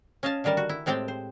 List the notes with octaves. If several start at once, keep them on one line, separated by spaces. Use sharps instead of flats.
C#4 D#5 F5 G#5 A5
D3 D#3 G3 A#4 A5
F#4
E4
A2 G#3 C4 G4 G5 A5
C5